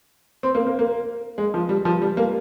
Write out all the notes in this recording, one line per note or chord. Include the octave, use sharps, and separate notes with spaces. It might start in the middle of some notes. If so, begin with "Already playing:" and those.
C4
A#3
A#3
A#3
G#3
F3
G3
F3
G3
A#3